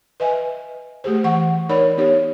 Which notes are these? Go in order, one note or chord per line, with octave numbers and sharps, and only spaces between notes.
B4 D#5 E5 G#5
A3 G4 G#4 C5
E3 F#5 C#6
D#4 A#4 C#5 D5 B5
B3 D#4 G4 C#5